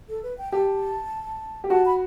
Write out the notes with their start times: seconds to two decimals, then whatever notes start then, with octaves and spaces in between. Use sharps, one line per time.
0.08 A4
0.23 B4
0.38 G5
0.52 G4 A5
1.64 G4
1.70 F#4 A5
1.85 B5